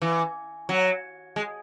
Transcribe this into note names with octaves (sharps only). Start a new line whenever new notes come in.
E3
F#3
G#3